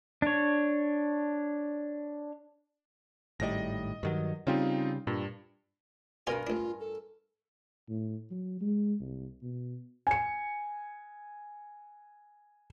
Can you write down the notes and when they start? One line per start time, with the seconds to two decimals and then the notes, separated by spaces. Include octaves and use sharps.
0.22 D4 C#5
3.40 G#1 A2 G3 D#5 A#6
4.03 G2 D#3 F#3
4.47 C#3 G3 C4 D#4 F4
5.07 G2 A#2
6.27 G2 B2 F4 A#4 D5 G#5
6.47 A1 D4 F4
6.80 A4
7.89 A2
8.31 F#3
8.61 G#3
9.00 C2
9.42 B2
10.07 G#5 C#7